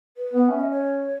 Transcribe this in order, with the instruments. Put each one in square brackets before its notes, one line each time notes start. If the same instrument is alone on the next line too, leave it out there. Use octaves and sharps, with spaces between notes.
[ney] B4
[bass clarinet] B3
[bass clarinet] C#4 [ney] E5
[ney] D#5
C#5